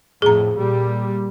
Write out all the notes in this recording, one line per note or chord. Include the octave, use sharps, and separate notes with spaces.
F2 A2 G#4 A#5
A#2 G3